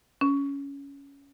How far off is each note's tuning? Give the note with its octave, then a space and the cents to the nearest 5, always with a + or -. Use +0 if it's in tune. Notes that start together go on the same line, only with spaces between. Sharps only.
C#4 +15